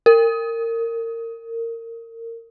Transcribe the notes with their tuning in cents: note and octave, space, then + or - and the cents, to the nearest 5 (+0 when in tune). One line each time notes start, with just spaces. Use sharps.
A#4 -25